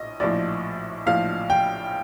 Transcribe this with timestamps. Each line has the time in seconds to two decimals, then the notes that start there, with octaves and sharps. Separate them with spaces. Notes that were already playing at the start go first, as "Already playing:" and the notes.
Already playing: A#1 A2 D#5
0.20 A#1 A2 F3 D5
1.06 A#1 A2 F3 F5
1.50 G5